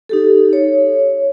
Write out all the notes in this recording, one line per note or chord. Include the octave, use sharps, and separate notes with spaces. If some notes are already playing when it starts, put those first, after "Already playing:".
D#4 G4 A4
C#5